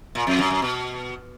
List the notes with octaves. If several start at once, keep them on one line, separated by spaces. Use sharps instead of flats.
A#2
F2
F#2
F#2
B2